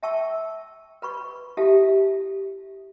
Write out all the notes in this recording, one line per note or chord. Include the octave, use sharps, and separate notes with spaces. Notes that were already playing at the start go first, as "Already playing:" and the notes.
E5 G5 A5 C#6 E6
B4 B5 C#6
E4 G4 A4 E5 F5 A5